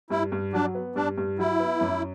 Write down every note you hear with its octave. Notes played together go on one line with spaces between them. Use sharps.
G2 E4
G2
F#3 D4
B3
G2 D4
G2
F#3 E4
B3
F#2